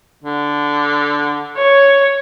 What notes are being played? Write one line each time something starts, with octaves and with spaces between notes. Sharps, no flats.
D3
C#5